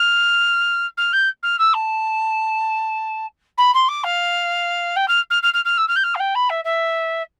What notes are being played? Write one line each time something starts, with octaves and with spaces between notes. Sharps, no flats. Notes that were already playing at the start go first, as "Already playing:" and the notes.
Already playing: F6
F6
G6
F6
E6
A5
B5
C6
D6
F5
G5
F6
F6
F6
F6
F6
E6
F6
G6
F6
F5
G5
B5
E5
E5